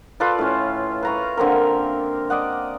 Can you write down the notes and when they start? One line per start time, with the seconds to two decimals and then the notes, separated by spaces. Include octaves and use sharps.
0.20 F4 A4 B4 D5
0.39 A2 C#4
1.03 B4 A#5 C#6
1.37 D3 A#3 C4 A#4
2.30 D5 D#5 F#5